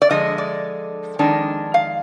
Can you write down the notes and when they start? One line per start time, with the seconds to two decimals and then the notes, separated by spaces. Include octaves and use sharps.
0.02 D5
0.10 D3 F3 G#3 D#5
0.38 D5
1.19 F2 D#3 G#3 D4
1.74 F5